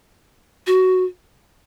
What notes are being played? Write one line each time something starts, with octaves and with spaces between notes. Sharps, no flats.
F#4